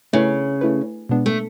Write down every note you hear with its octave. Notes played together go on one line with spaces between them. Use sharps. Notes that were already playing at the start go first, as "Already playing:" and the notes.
C#3 A3 E4 B4
A3 E4 B4
B2 G#3 B3 D4
A3